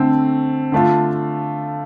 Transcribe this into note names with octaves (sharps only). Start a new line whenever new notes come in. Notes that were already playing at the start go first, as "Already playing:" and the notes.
Already playing: D3 A3 C4
D3 A3 D4 F4